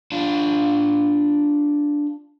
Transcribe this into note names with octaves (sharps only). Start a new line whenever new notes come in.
D4 F4